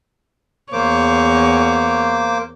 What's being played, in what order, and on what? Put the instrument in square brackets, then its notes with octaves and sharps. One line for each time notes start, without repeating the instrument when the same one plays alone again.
[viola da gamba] E2 C#5 [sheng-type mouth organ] A#3 C5 D6